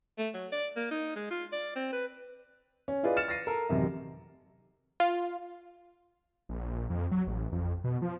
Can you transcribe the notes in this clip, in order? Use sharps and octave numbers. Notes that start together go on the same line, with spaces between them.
A3
F#3
D5
A#3
D#4
G#3
F4
D5
C4
B4
C#4
E4 F4 G#4 B4 D5 D#5
F6 A6 C#7 E7
A6 A#6 C7 D#7
A4 A#4
A1 F#2 C3 D#3
F4
A#1
F2
F#3
A1
F2
B2
F3